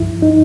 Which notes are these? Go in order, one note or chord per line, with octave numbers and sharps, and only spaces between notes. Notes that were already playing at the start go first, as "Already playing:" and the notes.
Already playing: C#2 G2 F3 E4
D#4